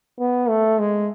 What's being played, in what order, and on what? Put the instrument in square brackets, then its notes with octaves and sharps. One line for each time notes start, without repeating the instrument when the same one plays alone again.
[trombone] B3
A3
G#3